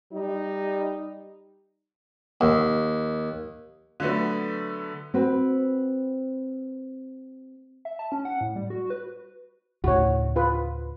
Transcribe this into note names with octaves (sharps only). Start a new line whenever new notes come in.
G3 D#4
D#2
D3 F#3 A3 B3
C4 F#4 B4
E5
A5
C#4
F#5
A2
G3
F#4
B4
D2 A2 C#3 F#4 C#5
F4 B4